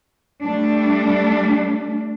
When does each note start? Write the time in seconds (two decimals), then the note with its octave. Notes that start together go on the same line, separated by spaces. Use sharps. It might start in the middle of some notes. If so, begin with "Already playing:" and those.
0.43 G3 A3 D4